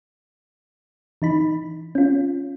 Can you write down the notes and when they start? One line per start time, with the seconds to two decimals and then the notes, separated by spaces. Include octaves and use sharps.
1.22 E3 D#4 B5
1.95 C#4 F4